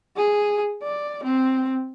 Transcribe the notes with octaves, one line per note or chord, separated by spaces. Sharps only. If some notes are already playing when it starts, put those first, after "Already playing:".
G#4
D5
C4